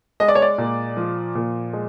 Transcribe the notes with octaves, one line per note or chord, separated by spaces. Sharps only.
G#3 D#5
D5
C#5
D5
A#2
F3
A#2
G#3